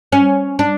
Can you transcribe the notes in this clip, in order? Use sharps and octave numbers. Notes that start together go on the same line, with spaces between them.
C#4
D4